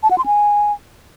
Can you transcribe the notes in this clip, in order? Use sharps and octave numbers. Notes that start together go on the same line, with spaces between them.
A5
F#5
C6
G#5